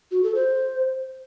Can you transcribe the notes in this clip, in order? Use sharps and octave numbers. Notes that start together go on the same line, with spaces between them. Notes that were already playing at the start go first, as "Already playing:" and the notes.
F#4
A4
C5